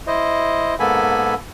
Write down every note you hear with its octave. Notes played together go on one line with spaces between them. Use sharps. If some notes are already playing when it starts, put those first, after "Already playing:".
E4 C5 D#5
G#2 A#3 B3 A4 G#5 B5